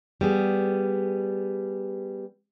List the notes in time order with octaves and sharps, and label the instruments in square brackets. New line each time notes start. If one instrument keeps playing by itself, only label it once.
[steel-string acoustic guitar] G3 B3 G#4